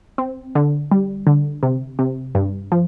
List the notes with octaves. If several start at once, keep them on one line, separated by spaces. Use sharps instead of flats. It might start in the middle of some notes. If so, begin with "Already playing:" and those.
C4
D3
G3
D3
C3
C3
G2
F3